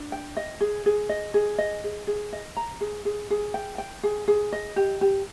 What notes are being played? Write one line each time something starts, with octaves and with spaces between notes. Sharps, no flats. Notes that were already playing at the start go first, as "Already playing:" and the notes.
Already playing: D4
G5
D#5
G#4
G#4
D#5
G#4
D#5
G#4
G#4
D#5
A#5
G#4
G#4
G#4
G5
G5
G#4
G#4
D#5
G4
G4